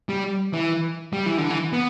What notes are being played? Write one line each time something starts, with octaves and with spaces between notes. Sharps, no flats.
G3
E3
G3
E3
D3
E3
B3